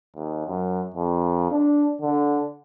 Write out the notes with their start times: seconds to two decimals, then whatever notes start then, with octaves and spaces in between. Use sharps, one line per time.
0.16 D#2
0.48 F#2
0.95 F2
1.51 D4
2.01 D3